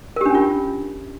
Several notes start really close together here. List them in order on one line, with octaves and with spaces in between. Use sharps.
A#4 G4 D4 C#4 F4